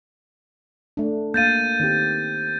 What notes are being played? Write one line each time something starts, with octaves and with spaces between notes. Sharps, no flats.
A3 D4
A#3 F5 G6 A6 D#7
D#3 C4 G4